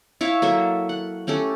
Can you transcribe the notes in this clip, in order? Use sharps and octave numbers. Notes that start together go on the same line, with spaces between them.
E4 C#5 E5 F5
F#3 A#3 A4 E5
F#5
A3 C#4 G4 A4